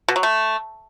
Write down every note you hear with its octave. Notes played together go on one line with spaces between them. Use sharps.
B2
F#3
A3